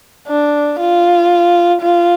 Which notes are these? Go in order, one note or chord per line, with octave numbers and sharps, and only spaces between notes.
D4
F4
F4